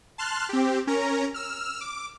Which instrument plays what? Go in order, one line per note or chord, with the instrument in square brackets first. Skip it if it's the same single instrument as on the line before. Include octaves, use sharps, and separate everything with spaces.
[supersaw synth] A5 C6 F6 F#6
C4 G4
C#4 A#4 A#5
E6 F6
D6